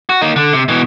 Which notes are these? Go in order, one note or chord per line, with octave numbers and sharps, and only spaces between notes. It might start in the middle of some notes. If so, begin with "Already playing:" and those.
F#4
A#3 D#4
D3
C3
B2 E3